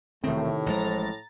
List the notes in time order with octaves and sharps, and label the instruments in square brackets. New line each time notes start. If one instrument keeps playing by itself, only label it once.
[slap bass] E1 C4 [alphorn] A2 [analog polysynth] C3 D#3 [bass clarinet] A3
[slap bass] A1 G#3 [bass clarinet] F3 [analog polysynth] A#5 A6